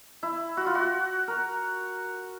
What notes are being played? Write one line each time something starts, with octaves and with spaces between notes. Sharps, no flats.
E4
F#4
F4
F#4
A#4